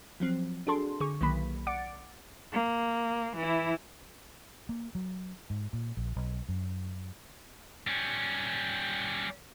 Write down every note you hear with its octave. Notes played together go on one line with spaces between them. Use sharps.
F3 F#3 C4
D4 F#4 G#4 A4 A5 C6
D3 G#4 C#6
B1 D#3 F#3 A#3 B5 B6
D5 F#5 D6 A6 C#7 D7
A#3
E3 E4
A#3
F#3
G#2
A#2
A#1
B1
F#2
G3 C#4